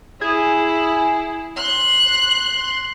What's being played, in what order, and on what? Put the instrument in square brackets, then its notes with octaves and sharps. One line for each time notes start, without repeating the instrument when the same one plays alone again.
[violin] E4 [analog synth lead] G#4
[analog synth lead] C6 [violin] F#6